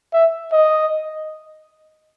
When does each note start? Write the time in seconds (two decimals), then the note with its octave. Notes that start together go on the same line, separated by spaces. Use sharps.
0.13 E5
0.52 D#5